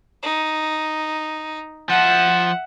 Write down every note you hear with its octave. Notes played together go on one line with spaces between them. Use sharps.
D#4
F3 E5 F#5